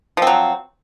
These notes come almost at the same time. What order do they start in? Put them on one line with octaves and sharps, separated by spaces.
F3 C4 F#3